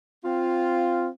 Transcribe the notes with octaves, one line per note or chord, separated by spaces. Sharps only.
C4 F4